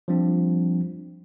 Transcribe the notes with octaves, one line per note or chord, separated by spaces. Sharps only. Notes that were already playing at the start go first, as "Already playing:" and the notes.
F3 G3 C4 D4